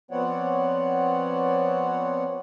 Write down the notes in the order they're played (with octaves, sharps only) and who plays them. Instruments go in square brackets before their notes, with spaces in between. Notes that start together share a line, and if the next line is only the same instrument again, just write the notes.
[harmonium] F3 B3 C4 C#5 D5 F#5